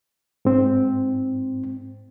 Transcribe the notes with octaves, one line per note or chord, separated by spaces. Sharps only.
G#2 C4